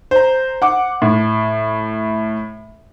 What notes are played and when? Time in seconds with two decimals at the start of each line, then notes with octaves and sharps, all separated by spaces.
0.11 C5 A#5
0.62 F#5 D6
1.02 A2